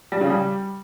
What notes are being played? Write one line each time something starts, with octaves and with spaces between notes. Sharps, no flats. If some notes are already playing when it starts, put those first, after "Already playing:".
G3
C#3
G3